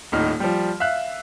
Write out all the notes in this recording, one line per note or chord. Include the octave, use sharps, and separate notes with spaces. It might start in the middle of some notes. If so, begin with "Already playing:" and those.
D#1 A2 D#4 F6
F3 G3
E5 F5 F#6